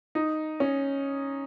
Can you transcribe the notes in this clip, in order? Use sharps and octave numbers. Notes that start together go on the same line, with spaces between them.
D#4
C#4